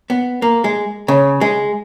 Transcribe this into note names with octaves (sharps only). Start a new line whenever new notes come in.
B3
A#3
G#3
C#3
G#3